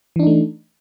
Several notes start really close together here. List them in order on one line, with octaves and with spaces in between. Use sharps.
E3 D4 D#4 A3